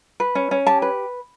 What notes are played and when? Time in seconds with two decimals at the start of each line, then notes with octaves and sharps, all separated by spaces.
0.20 B4
0.35 C#4
0.51 C#4
0.67 G4 A5
0.82 B4